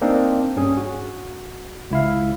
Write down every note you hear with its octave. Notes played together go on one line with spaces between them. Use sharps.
A#3 C4 D4 D#4
G2 C#4 G#4
F#4
C#2 E4 F5